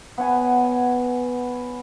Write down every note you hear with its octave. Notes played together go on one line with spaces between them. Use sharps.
B3 C#5 F#5 G#5